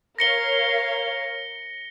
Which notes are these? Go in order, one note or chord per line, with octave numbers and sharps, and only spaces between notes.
A#4 C#5 F5 A#6 C#7 G7